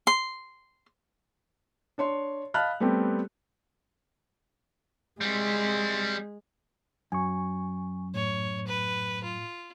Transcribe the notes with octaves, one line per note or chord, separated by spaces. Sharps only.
C6
D4 C#5 C6
D#5 F5 A5 B5 F6 F#6
G3 A3 B3 C4 G4
G3 G#3 C4
F#2 G#5 C#6
A2 C#5
B4
F4